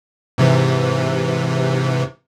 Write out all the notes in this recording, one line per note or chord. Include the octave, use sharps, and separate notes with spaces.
G#2 C3 E3